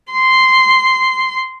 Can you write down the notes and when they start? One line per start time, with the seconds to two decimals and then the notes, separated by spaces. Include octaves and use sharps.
0.11 C6